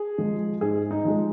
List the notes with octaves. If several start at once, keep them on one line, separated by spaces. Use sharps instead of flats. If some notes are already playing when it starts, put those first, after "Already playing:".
Already playing: G#4
F3 G#3
G#2 G#4
D#4
F3 G#3